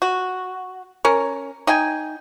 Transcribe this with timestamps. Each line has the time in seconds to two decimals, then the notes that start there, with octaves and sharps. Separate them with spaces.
0.02 F#4
1.05 C#4 A#4
1.67 D#4 G5 G#5